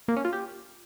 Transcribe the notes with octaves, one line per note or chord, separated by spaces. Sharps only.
A#3
C#4
F4
G4